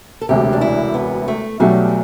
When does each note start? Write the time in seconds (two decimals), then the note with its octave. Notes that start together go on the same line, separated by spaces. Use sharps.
0.21 A4
0.29 E1 D2 C3 G4
0.53 D4
0.61 E4
0.94 B3
1.28 A3
1.60 B1 B2 F#3 G3 A3